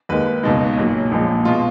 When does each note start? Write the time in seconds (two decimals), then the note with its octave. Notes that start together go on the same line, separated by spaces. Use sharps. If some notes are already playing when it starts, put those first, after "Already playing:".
0.09 D#2 D#3 G#3 B4
0.26 B4
0.43 C#2 B2 G#3 D#4
0.61 D#4
0.77 B1 A#2 F#3
1.11 A#1 A#2 F3 G#3
1.45 B2 G#3 F4